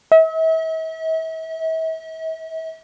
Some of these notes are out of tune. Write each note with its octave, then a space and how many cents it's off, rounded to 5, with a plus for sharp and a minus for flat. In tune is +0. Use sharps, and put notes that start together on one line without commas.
E5 -40